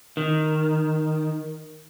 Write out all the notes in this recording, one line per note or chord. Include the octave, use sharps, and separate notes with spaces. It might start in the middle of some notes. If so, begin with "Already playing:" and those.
D#3